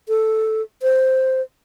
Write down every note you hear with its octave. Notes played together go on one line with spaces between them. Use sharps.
A4
C5